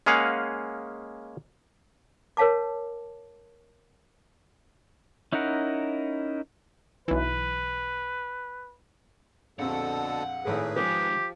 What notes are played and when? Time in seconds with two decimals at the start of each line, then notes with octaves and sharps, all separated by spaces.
0.06 G#3 A#3 C#4 G#4 F5 F#5
2.37 A#4 C#5 F5 A5 D6
5.33 C#4 D#4 E4 A#4 F#5
7.08 B1 E3 B4
9.59 A#1 F2 B2 D3 A4 F#5
10.45 G#1 A2 G#3 G#4 B4
10.76 D#3 F3 G#3 G4